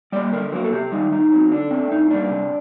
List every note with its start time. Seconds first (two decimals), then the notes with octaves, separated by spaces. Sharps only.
0.12 G3 A#3 D5
0.33 D3 A#4
0.52 F#3 A#3 A#4
0.64 A4
0.72 C3 G4
0.92 D#3 G3 D#4
1.11 A2 D#4
1.32 F#3 C4
1.51 D3 D4
1.71 A3 C4
1.91 A2 D#4
2.11 G3 A#3 D4
2.30 C3